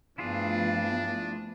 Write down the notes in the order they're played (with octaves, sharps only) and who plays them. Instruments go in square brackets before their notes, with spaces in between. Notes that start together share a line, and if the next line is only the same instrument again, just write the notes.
[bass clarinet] G2 [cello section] F3 A3 B3 [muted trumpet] D4 [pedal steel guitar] E4 F4 G#4